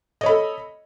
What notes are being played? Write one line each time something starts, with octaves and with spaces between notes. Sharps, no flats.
A4 C#5 D#5 B5